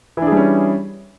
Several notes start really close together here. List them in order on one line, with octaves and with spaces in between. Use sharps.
E3 D4 G#4 G3 C#4